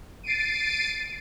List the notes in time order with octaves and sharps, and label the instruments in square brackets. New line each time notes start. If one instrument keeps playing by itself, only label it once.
[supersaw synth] A6 C7 D7 D#7